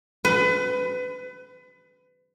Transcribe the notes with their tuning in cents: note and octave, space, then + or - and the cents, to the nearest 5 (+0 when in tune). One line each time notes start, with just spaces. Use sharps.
B4 +30